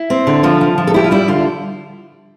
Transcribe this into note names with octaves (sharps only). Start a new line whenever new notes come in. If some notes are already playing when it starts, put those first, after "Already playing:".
Already playing: E4
C4
D3
F3 F4
F3
F3
A4
E4 G4
F4
G3 E4
D3 F4